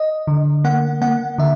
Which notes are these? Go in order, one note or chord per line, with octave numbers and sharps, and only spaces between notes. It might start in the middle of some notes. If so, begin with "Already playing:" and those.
Already playing: D#5
D3
A#3 F#5
A#3 F#5
D3 E5